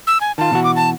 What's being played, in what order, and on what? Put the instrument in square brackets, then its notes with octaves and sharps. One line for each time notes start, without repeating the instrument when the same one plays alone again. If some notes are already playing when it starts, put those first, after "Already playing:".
[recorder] E6
G#5
[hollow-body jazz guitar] D#3 F4 [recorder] A5
[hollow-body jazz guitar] B2 E3 F#4
[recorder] D6
A5